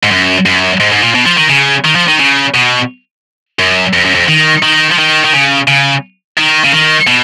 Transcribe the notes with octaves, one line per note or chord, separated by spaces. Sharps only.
G#2
F#2
F#2
G#2
G#2
A#2
B2
F3
D#3
C#3
D#3
F3
D#3
C#3
B2
F#2
F2
F#2
F2
D#3
D#3
F3
D#3
D#3
C#3
C#3
D#3
C#3
D#3
B2